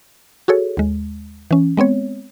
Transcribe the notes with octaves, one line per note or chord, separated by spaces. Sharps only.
F#4 G#4 A4 C#5
D#2 G#3
E3 C#4
G#3 B3 C4 C#5